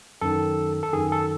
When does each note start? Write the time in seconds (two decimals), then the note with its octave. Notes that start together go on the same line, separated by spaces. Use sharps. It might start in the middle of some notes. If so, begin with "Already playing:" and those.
0.21 F#2 D#3 A4
0.83 A4
0.93 F#2 D#3 G#4
1.12 A4